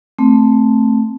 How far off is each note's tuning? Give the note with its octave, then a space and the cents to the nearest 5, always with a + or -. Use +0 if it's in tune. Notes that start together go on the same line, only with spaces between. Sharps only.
A3 +0 C4 +0